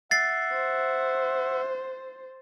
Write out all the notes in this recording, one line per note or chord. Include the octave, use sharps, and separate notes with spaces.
E5 F#5 A6 C7
C5